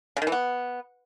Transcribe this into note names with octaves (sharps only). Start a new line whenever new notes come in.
C#3
D#3
E3
B3